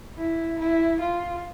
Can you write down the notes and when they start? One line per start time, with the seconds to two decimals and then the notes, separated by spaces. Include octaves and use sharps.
0.17 E4
0.59 E4
1.01 F4